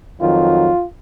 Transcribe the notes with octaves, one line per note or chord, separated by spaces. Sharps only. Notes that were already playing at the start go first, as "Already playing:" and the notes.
F2 D#3 F#3 F4